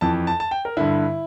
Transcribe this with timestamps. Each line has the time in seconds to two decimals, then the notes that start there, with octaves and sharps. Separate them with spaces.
0.01 F2 E3 A5
0.27 A5
0.40 A5
0.51 G5
0.65 A#4
0.77 G2 D3 E4